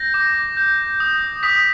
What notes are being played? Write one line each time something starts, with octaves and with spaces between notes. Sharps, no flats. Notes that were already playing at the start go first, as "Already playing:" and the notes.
Already playing: G6 A#6
D6
G6
D#6
D#6 B6